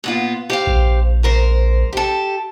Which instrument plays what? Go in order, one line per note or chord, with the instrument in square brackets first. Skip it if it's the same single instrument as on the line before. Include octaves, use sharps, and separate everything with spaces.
[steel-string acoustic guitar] A#2 B3 F4
G4 C5 F5
[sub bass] A#1
[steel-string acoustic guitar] G#2 A#4 C5
G4 A4